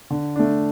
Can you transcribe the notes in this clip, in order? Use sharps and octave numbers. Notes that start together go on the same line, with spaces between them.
D3
A3 D4